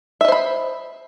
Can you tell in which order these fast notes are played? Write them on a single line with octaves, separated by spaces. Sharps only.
E5 D#5 C5 B5